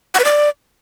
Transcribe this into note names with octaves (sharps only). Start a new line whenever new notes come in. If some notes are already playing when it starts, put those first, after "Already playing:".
F#5
B4
D5